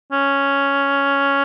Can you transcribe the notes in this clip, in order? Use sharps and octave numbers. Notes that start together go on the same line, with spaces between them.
C#4